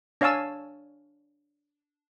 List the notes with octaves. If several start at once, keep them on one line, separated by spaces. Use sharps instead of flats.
D4 C#5 F5 G#5 A5 E6